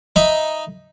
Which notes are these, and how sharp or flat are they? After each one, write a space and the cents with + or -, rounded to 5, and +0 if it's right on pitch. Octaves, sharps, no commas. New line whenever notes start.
D#4 +0 E5 +0 B5 +0